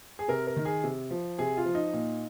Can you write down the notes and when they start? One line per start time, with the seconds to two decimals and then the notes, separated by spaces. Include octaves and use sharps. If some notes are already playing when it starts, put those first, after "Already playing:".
0.19 G#4
0.28 C3 A#4
0.47 A#4
0.57 D#3
0.65 G#4
0.84 C3
1.11 F3
1.39 C3 G#4
1.57 F4
1.65 F3
1.75 D#4
1.93 A#2